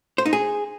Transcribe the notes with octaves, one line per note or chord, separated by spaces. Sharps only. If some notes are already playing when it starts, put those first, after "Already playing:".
C5
D#4
G#4